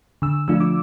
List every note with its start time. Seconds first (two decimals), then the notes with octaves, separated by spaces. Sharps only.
0.22 D3 E6
0.48 F3 A3 D4 F4 E6
0.60 D6